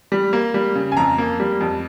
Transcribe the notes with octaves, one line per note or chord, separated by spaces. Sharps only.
G3
A#3
G3
C#3
G#5
F2 A#5
A#3
G3
F2